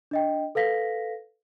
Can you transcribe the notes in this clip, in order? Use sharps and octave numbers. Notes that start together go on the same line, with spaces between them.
D4 D#5 G5
A4 B4 F5 A#6 B6